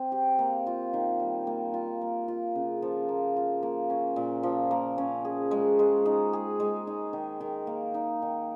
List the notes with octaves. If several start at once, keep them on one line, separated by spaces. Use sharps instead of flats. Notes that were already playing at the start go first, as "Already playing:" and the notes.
Already playing: C4
G4
A#3
F4
D#3
G3
A#3
F4
A#3
F4
C#3
F3
A#3
F4
A#3
C#4
A#2
F3
A#3
C#4
G#4
G#3
G#3
D#4
G#4
G#3
D#4
D#3
D#3
A#3
D#4
D#3